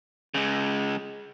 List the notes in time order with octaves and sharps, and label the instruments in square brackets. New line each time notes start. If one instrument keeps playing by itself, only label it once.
[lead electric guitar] C#3 G#3